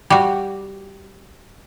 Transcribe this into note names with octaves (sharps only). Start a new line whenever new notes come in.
G3 F#4